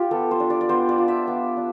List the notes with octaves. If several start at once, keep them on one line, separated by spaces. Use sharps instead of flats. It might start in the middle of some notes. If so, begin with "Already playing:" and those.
Already playing: F4 G4
B3 A4
C5
D4
D5
D5
B3 C5
D5
F4
E5
B3
D4